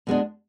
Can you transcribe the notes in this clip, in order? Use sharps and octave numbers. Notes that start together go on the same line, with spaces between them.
B2 G#3 B3 D4